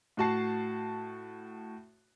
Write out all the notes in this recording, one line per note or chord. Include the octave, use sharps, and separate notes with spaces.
A2 F#4 A5 C7